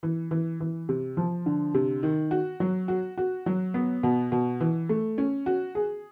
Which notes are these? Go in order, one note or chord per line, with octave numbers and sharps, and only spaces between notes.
E3
E3
E3
C3
F3
D3
C3
D#3
F#4
F#3
F#4
F#4
F#3
B3
B2
B2
E3
A3
C#4
F#4
G#4